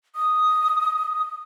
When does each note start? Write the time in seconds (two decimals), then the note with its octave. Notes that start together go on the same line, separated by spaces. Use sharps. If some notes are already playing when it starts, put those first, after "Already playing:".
0.15 D#6